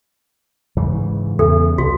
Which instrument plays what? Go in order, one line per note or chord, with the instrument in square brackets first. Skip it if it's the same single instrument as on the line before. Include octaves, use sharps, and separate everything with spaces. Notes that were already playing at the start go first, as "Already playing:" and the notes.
[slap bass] G#2 C#3 E3
[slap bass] E2 C#3 [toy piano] A4
[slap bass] C2 [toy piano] F#4